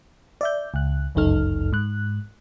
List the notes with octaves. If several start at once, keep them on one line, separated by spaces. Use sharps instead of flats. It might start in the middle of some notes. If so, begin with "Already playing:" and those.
D5 E5 G6
C#2 F#6
G1 C#2 F#2 D#4 A4 F6
G#2 F#6